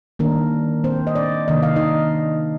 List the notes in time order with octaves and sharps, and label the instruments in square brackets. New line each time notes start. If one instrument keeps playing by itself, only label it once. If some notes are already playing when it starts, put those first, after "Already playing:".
[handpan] D#3 G3 A#3 D4 A#4
C4 C5
D#5
D4 D5
C3 D#3 A#3 D4 D#5
F5
D#4 D#5